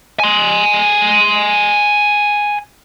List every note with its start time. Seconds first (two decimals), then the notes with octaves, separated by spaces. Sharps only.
0.20 G#5 C6